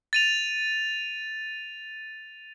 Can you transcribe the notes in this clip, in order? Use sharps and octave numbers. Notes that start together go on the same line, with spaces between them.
A6 D#7 F7